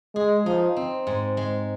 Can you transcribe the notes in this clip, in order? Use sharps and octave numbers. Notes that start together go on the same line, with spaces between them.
G#3 G#4
F3 D#4
C4
G#2
G#3